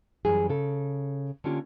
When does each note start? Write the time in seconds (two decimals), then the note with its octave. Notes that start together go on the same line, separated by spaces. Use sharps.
0.25 F#2 E3 G3 G#4
0.49 C#3 A4
1.44 D3 A#3 C#4 F4 G4